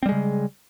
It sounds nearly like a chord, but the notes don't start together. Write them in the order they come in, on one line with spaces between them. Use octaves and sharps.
C4 G3 G#3 C#3